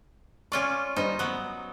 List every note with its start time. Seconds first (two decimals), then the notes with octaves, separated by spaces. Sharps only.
0.52 C#4 F4 C#5 D5 C#6
0.96 G2 D#4 C5 G7
1.19 F#3 B3 F#6